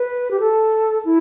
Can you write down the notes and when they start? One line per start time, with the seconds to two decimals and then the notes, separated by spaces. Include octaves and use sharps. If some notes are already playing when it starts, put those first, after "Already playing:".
Already playing: B4
0.31 G4
0.40 A4
1.05 E4